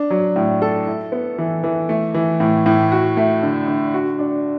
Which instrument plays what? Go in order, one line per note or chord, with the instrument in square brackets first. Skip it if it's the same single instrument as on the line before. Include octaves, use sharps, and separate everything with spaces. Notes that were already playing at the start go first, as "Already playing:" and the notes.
Already playing: [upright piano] D4
F#3
A2
A4
E4
B3
E3
E3
A3
E3
A2
A2
F#4
A3
D3
D3
F#4
D4